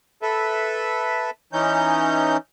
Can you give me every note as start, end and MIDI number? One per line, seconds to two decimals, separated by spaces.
0.22 1.30 69
0.22 1.30 71
0.22 1.30 76
1.53 2.37 52
1.53 2.37 61
1.53 2.37 63
1.53 2.37 91